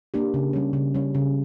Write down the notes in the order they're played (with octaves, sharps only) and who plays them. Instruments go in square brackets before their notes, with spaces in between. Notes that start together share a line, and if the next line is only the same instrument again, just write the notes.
[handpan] A#3 D4 G4
C#3
G3 C#4
C#3
G3 C#4
C#3